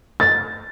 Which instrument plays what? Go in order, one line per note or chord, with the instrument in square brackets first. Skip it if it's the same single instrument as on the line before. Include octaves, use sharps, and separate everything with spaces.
[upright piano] A6